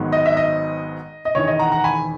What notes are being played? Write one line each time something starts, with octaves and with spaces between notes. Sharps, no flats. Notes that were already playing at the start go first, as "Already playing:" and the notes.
Already playing: G#1 G#2 D#3 F#3 B3
D#5
E5
D#5
D#5
E1 E2 D#3 C#5
D#5
F#5 A#5
F#5 A#5
G#5 B5